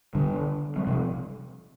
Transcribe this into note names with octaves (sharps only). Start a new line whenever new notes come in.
D3 G3
G3 C4
C3 F3